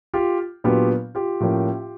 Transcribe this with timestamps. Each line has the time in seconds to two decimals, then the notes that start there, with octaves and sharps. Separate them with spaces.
0.14 F4 G4
0.64 A#2 F#3 B3 D4 F4 G4
1.15 F4 G4
1.40 A2 F3 A#3 C#4